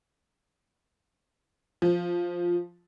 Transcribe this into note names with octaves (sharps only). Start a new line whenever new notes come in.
F3